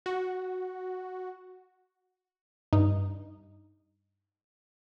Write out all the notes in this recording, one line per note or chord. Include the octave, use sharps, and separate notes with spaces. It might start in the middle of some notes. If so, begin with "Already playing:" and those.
F#4
G2 D#4